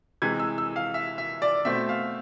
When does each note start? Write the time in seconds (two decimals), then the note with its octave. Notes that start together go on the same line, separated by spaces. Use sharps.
0.22 C3 E3 G#3 G#6
0.40 E6
0.58 E6
0.76 F5
0.94 E5
1.18 E5
1.42 D5
1.65 B2 A3 C4 E5
1.89 F5